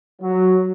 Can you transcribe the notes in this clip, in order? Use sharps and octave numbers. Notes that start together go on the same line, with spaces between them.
F#3